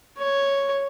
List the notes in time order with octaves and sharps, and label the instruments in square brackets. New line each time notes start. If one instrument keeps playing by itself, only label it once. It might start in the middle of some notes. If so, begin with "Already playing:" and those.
[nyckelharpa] C#5